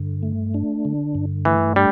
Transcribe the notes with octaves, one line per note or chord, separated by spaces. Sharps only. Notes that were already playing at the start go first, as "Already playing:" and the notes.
Already playing: G2 D3
A3
D4
D3
G2
E3 A3
G3 D4